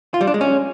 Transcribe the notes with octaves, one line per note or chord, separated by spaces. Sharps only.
F4
G3
D4
G#3
C#4